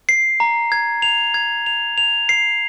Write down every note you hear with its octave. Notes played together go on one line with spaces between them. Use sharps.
C7
A#5
G#6
F7
G#6
F7
F7
C7